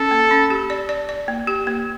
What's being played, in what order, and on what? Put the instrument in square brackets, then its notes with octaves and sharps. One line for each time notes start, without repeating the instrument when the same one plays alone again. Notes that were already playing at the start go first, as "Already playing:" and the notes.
Already playing: [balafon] C#4 [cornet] A4
[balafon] A#3
C#4
G4
D5
D5
D5
A#3
G4
A#3